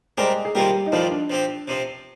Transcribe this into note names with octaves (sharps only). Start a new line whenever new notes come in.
G3 G#3 C4 G4 G#4 A#4
G#4
C3 D#3 G3 A#3 F4 G4 A#4
D#4
F2 D#3 F3 G3 C4 F4
D4
F3 C4 G4
C3 F3 C4